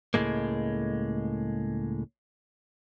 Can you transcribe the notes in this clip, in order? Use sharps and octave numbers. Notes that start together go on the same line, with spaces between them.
C#2 A2 C3 G#3 A#3